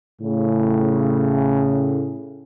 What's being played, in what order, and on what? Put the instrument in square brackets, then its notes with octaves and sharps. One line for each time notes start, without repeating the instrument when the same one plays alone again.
[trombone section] A2 C#3